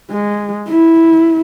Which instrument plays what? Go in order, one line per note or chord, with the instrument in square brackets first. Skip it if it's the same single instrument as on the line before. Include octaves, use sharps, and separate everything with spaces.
[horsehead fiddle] G#3
E4